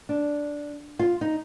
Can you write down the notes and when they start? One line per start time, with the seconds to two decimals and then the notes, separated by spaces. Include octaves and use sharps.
0.09 D4
0.99 F4
1.21 D#4